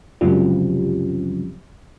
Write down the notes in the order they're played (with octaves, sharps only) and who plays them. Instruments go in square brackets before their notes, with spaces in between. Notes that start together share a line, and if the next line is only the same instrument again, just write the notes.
[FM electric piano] C#2 F#2 C3 F3 G3